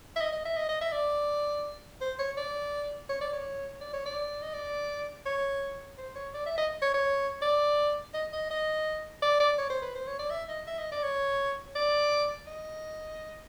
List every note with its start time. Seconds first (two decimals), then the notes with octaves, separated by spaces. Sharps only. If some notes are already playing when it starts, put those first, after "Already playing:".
0.16 E5
0.21 D#5
0.32 D#5
0.45 E5
0.57 D#5
0.69 D#5
0.81 E5
0.92 D5
2.01 C5
2.19 C#5
2.37 D5
3.09 C#5
3.21 D5
3.33 C#5
3.81 D5
3.93 C#5
4.06 D5
4.42 D#5
4.54 D5
5.26 C#5
5.98 C5
6.16 C#5
6.34 D5
6.46 E5
6.58 D#5
6.82 C#5
6.94 C#5
7.42 D5
8.14 D#5
8.33 D#5
8.50 D#5
9.22 D5
9.40 D5
9.58 C#5
9.70 C5
9.82 B4
9.95 C5
10.07 C#5
10.19 D5
10.31 E5
10.49 D#5
10.67 E5
10.79 D#5
10.91 D5
11.03 C#5
11.75 D5
12.47 D#5